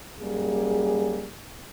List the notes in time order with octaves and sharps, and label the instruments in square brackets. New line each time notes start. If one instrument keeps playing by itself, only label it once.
[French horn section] F#2 G3 A#3 G#4